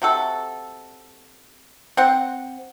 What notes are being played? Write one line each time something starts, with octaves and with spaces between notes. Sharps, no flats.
C3 F#4 A4
C4 F#5